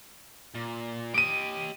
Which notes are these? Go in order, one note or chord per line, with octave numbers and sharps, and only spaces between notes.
A#2
G4 D#5 D7 D#7